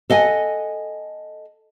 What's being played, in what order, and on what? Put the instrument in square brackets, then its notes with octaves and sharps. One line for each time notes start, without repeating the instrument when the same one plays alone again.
[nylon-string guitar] A4 D#5 F#5 G#5